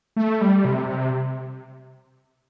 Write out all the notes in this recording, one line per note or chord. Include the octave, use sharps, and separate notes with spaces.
A3
G3
C3
C3